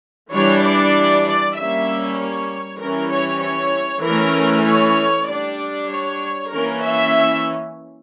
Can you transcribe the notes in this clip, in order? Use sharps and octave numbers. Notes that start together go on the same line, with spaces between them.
E3 G3 D4 C#5
D5
D5
G3 A#3 C#4 E5
C#5
E3 G3 C#4 A#4
C#5
C#5
E3 A3 C#4 A#4
C#5
G3 D4 D5
C#5
E3 A#3 C#4 A#4
E5